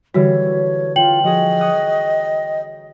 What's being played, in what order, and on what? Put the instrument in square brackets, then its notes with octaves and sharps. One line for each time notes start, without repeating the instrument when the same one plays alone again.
[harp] D3 E3 G3 [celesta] F#4 [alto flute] C#5
[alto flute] F4 [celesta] G5 F#7
[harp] F3 F#4 G#4 [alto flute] D#5
[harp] C#5 D#6 F#6